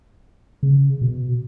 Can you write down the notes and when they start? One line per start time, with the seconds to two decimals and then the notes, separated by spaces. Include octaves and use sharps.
0.63 C#3
1.02 B2